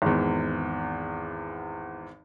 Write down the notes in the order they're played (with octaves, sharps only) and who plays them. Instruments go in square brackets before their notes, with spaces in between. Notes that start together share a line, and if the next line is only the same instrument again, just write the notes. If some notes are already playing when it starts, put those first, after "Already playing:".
[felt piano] G#1 E2